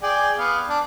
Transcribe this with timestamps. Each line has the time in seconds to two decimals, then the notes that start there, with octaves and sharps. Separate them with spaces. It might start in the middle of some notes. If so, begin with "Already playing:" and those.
0.03 G#4 D5 G5
0.38 B3 F5
0.69 D4